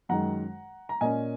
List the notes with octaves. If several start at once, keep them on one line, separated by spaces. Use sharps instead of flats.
F#2 D#3 G#3 F#5 A#5
A#5
A#2 A#3 C#4 D#5 G#5